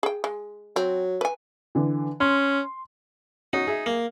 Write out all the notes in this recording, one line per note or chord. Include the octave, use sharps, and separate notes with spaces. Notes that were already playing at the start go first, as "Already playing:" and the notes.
G#4 G5
G#3
F#3 C4
B4 G#5
D3 E3
C#4 C6
C#4 D#4 F#4
G#4 E5
A#3